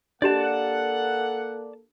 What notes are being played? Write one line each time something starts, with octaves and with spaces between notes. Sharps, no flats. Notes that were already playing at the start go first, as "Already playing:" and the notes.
A#3 D4 G4 A4 D5 D#5 F#5 A5